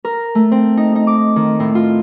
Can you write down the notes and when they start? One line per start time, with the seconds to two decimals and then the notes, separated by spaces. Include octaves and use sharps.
0.05 A#4
0.35 A3
0.51 C4
0.77 D#4
0.96 D#4
1.07 D6
1.36 D#3
1.60 A2
1.75 F4